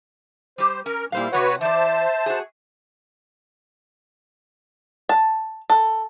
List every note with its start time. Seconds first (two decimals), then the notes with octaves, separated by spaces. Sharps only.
0.58 G3 G4 C5
0.86 C#4 A#4
1.12 A#2 G3 E4 C5 F5
1.33 C3 G3 F#4 B4 C#5 F#5
1.61 E3 C5 D5 E5 A5
2.26 F#4 G#4
5.09 A5
5.70 A4